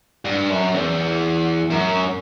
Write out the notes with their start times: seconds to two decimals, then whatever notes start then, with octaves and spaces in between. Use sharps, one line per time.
0.25 G2
0.49 F#2
0.74 E2
1.70 F#2